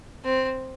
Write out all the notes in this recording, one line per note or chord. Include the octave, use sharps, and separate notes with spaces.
C4